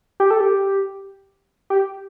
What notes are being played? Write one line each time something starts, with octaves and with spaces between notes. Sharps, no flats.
G4
A4
G4
G4